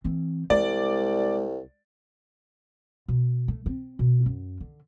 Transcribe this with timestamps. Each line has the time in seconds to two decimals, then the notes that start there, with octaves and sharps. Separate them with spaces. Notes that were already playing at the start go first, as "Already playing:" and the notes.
0.04 E3 C4
0.50 C2 G#3 D5
3.08 B2
3.48 A3
3.66 C4
3.99 B2
4.26 F#2
4.60 D3